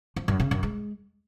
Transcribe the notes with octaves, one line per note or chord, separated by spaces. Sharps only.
F3
F#2
C#3
F#2
G#3